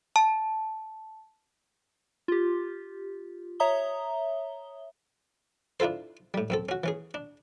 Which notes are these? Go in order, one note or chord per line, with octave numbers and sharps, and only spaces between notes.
A5
F4 G4
C#5 E5 A#5 D#6 G7
D4 E4 F4 A4 C5
A2 G3
F#2 C4 A4
C#4 F#4
E3 C#4 G#4
D4